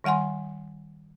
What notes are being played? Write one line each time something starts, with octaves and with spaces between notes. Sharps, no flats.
D#3 G3 F#5 G#5 C6